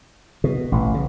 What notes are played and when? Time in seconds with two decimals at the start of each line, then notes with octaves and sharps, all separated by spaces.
0.44 B2
0.72 A1
0.94 C#3